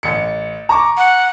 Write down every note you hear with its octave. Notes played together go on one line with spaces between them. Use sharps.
A1 C#7
A#5 C#6 D6
F#5